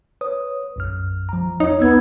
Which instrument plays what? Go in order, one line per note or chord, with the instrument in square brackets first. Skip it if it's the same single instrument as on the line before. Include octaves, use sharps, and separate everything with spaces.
[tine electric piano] B4 C#5 D#6
B1 F#2 F6
F3 A#5
[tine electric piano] E2 C#5 [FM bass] D#4
[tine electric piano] C2 E6 G#6 [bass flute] B3